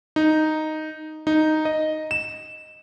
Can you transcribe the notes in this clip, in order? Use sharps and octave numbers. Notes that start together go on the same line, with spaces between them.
D#4
D#4
D#5
E7